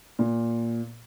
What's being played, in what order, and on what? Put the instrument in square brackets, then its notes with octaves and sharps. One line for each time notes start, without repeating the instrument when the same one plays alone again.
[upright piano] A#2